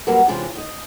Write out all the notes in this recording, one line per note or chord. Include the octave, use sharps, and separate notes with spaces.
F#3 G3 A#3 C#4 A#4 B4
C3 E3 G#3 C#4 D4 F4
D#4 D#5